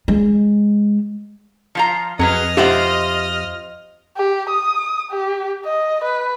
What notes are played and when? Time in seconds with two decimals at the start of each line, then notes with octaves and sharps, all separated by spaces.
0.08 G#3
1.75 F3 F4 A#5
2.19 F2 F#3 G#4 B4 D#5 F6
2.57 F4 G4 C5 E5 F#5
4.17 G4
4.49 D#6
5.11 G4
5.65 D#5
6.04 B4